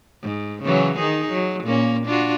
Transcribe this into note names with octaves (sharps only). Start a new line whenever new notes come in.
G#2
C#3 E3 F#3
D#3 D#4 G#4
F#3
A#2 A#3 C#4
D4 F4 F#4